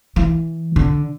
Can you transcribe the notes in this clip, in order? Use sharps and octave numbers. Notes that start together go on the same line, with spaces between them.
E3
D3